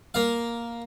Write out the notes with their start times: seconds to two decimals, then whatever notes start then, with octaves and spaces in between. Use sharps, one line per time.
0.14 A#3 F5